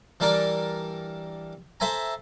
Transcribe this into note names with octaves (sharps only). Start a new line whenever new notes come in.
E3 G3 D4 A#4 D5
A4 C5 E5 G#5 A#5